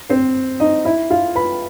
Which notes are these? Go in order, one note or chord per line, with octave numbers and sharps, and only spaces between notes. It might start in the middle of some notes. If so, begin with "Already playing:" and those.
C4 C5
D#4 D#5
E4 E5
F4 F5
B4 B5